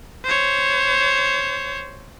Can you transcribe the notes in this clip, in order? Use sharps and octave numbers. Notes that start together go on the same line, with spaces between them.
C5 C#5